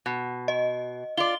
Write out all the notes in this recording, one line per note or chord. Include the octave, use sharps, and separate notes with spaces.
B2
D#5
F4 D5 G7